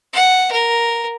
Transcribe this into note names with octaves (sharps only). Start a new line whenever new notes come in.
F#5
A#4